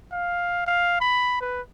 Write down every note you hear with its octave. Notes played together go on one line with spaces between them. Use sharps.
F5
F5
B5
B4